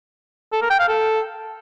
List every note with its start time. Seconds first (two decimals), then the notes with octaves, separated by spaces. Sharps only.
0.53 A4
0.62 A#4
0.70 G5
0.79 F5
0.88 A4